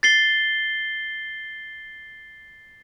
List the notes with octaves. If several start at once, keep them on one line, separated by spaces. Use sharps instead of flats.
A6 C7 G7